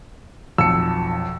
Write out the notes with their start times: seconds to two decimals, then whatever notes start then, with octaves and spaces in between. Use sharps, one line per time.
0.58 B1 F2 E6 C#7